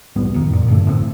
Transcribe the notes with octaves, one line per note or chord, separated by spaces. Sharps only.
C2 A2 G3 B3
B1 F2 D#3
A#2
G2 D3 A3
G#1 A2 D3 C4